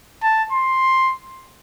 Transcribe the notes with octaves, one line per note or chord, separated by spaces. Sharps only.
A5
C6